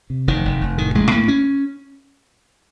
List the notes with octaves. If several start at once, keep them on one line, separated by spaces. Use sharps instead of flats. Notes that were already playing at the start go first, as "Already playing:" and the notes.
C3
F1 D#3
F1
F1
A2 D#3
A1 G#3
A2 A#3
C#4